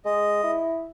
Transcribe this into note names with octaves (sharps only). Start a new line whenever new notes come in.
G#3 D#5
E4